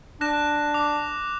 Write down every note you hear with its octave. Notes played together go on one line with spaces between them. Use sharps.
D4 F#6 A#6 E7
D6